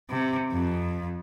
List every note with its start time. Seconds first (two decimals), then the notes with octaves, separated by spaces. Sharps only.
0.10 C3
0.52 F2